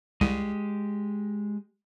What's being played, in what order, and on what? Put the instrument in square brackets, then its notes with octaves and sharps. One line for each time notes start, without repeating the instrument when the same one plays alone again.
[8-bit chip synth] C2 [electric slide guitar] G#3 G4